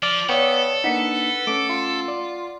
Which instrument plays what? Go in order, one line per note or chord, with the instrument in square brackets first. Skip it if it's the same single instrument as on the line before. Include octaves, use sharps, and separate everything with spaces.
[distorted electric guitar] F3 [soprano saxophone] D5 [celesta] F6
[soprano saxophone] B3 [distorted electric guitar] A4 [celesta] C#5 D5 F5 [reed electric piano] G5 C#6 D#6
[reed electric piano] A#3 D4 D#4 [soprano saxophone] B4 [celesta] F#5 B6 C#7
[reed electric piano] A3 C#4 [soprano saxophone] D6
[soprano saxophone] F4
[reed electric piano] D5